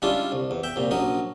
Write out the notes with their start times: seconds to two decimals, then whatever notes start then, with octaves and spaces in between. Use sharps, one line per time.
0.02 G3 G#3 C#4 D4 E4 F4
0.32 C2
0.51 E2
0.63 E5 G5
0.76 C2 A#2
0.91 A#1 F#3 C#4 D#5